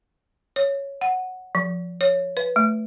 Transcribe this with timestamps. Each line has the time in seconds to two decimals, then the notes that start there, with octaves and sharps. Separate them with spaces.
0.56 C#5
1.01 F#5
1.55 F3
2.01 C#5
2.37 B4
2.56 A3